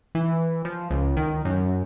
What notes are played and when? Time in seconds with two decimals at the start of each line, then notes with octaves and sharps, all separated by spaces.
0.15 E3
0.65 F3
0.91 C#2
1.17 D#3
1.45 F#2